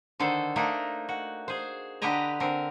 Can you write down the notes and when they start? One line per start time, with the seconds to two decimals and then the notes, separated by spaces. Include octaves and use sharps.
0.20 D3 D#3 A4 C5
0.56 A3 A#3 D4 D#4 D#5
1.09 F#4
1.48 G#4 C5
2.02 D3 G4 B4 D#5 A#5
2.40 D3 C4 A#4